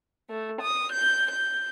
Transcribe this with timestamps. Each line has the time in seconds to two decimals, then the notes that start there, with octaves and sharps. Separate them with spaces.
0.29 A3
0.61 D#6
0.92 G6
1.31 G6